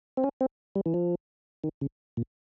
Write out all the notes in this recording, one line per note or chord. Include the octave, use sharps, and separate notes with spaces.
C4
C#4
C4
G3
E3
F3
D#3
C#3
A#2